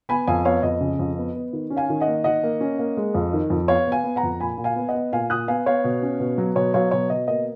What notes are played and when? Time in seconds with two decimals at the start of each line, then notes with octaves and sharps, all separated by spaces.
0.09 B3 G#5 B5
0.27 F2 F5 G#5
0.45 B3 C#5 F5
0.63 F2 D#5
0.81 C#3
0.99 F2
1.18 B3
1.35 B3
1.53 D#3
1.70 C#4
1.76 F5 G#5
1.90 D#3
2.01 D#5 F#5
2.07 A#3
2.24 D#3 D#5 F#5
2.43 A#3
2.61 C#4
2.79 A#3
2.97 G#3
3.15 F2
3.33 D#3
3.50 F2
3.68 B3 C#5 F5
3.87 B3 F5 G#5
4.04 B3
4.16 F#5 A#5
4.23 F2
4.40 A#2 G#5 B5
4.58 A#2
4.64 F5 G#5
4.76 B3
4.89 D#5 F#5
4.95 B3
5.13 A#2 F5 G#5
5.30 A#2 D#6 F#6
5.48 B3 F5 G#5
5.66 B3 C#5 F5
5.84 B2
6.02 C#4
6.20 B2
6.38 F#3
6.56 B2 C#5
6.74 F#3 C#5 F5
6.91 B2 C#5
7.10 B2 D#5
7.28 A#3 D#5